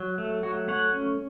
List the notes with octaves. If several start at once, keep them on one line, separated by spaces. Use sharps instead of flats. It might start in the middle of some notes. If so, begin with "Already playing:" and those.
Already playing: F#3
A3
F#3 F#4
A3 C#5 F#5
C#4